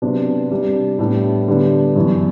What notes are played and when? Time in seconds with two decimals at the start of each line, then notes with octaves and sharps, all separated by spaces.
0.02 C3 F#3 B3 D4
0.50 C3 G3 D4
0.99 A2 G3 B3 D4
1.48 D3 G3 B3 D4
1.96 F#2 E3 B3